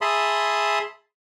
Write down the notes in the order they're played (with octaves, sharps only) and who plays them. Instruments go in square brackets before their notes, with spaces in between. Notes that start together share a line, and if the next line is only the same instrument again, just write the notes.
[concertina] G#4 E5 A5 B5 C6 D#6